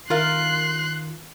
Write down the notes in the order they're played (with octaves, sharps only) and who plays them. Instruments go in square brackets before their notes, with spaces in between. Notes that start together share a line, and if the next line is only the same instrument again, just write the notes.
[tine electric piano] D#3 [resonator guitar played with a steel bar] F4 A#4 F5 [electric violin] C6 F#6